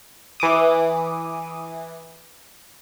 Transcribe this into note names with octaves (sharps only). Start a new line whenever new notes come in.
E3 D6 D#6